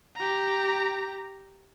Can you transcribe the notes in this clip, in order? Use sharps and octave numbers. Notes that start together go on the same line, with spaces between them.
G4 A#5